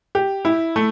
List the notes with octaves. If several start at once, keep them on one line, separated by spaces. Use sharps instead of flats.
G4
E4
A3